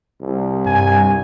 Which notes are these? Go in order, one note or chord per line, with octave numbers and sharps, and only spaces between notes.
C2
G2 G#5